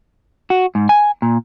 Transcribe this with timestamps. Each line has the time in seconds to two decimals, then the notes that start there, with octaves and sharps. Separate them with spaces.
0.50 F#4
0.75 G#2
0.89 G#5
1.22 A#2